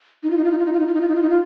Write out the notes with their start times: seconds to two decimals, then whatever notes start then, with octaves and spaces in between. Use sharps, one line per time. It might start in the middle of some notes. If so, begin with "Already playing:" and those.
0.23 D#4
0.31 F4
0.37 D#4
0.44 F4
0.52 D#4
0.58 F4
0.66 D#4
0.73 F4
0.80 D#4
0.87 F4
0.94 D#4
1.01 F4
1.08 D#4
1.16 F4
1.22 D#4
1.30 F4